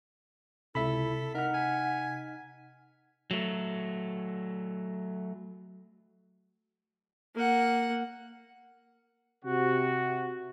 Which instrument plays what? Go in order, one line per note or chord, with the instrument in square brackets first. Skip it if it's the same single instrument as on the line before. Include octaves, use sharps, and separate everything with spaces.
[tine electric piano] C#2 E5 B5 [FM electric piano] C3 B6 [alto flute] E4 [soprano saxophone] A4
[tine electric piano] D#4 F6 [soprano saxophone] A#4 [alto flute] F#5
[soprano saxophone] G#5
[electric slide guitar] F#3 A3
[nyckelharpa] A#3 F#5
[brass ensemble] C3 F#4